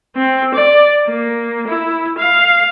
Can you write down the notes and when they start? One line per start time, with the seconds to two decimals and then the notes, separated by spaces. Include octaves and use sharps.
0.16 C4
0.54 D5
1.07 A#3
1.68 E4
2.18 F5